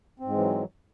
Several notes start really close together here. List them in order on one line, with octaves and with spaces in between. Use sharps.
C4 G#2 G#3 E3 F#3